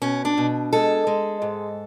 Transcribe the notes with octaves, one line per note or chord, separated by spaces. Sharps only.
B2 C#4
D4
B2
G#3 A4
G#3
G#2